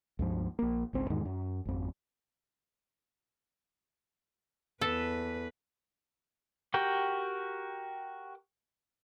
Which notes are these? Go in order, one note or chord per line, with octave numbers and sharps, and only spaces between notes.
C#2 G2 F3
A#1 A#3
G#1 C#2 C4
E2 G#2 D#3 G#3
F#2
G#1 F2
E2 A4 B4
F#4 G4 A#4 G5